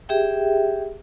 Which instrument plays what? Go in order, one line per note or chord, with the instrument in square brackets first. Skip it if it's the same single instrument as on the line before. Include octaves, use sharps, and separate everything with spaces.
[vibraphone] G4 G#4 E5 G5